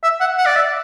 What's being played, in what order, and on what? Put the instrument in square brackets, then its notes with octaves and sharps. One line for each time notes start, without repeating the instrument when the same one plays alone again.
[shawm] E5
F#5
F#5
D5
E5